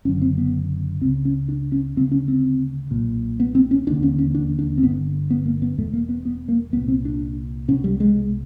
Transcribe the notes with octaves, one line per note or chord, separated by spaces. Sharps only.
F#1 F#2 D3 C#4
C4
B3
C#2 C#3 C4
C#4
D4
C#4
D2 C#3 C4
C#4
C4
B1 A#2
B3
C4
C#4
E1 D#2 D3 D4
C#4
C#4
D4
D4
C4
G1 G2 D3 B3
B3
A#3
B3
E1 E2 B2 A3
A#3
B3
B3
A#3
C2 A#2 B3
C4
D4
C2 B2 C#4
G3
G#3